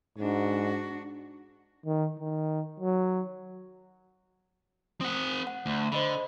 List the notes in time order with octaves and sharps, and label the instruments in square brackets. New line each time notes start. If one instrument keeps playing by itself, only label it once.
[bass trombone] G#2 [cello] D4 F#4
[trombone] D#3
D#3
F#3
[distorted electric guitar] C4 F#5 [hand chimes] D#6
[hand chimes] F#5
[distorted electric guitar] D2
[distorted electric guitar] D3 [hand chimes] C5 D#5 B5